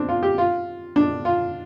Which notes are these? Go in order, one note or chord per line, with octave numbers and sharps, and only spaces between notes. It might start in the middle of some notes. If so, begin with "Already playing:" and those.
Already playing: C4 D4
F4
G4
F4
D4
F4